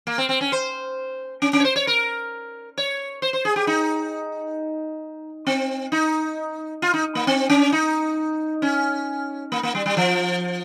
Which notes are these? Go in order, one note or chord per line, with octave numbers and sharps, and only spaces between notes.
A#3
C4
C4
C#4
C5
C#4
C#4
C#5
C5
C#5
A#4
C#5
C5
C5
G#4
G4
D#4
C4
D#4
F4
D#4
A#3
C4
C#4
D#4
C#4
A#3
A#3
G3
G3
F3